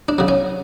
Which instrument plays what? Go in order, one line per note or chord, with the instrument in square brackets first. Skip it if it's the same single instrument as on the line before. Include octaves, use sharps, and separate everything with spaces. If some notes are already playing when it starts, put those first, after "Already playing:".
[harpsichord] D4
C#3 F#3
C#4